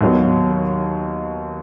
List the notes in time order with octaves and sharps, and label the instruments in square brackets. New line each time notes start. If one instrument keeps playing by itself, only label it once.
[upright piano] D#2 D#3 F#3 B3